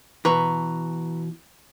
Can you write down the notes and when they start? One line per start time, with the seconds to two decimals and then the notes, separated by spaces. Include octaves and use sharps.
0.25 B2 E3 B4 A#5 C#6